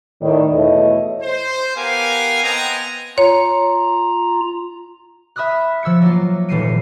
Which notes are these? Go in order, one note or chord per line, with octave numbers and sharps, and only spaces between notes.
A2 D#3 D5
E2 B2 A3 E4 C#5 D#5
C5
B3 G4 A#4 F5 G#5
B3 C4 D#5 G5 G#5 A#5
F4 C#5 A#5
E5 B5 D#6 F6 F#6
F3 E6 G#6 C#7
F#3 A#3 F4
D#1 E3 A3 C7 C#7 D#7